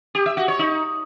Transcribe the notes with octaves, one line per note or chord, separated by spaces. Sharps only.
G4
E5
F#4
C#5
D#4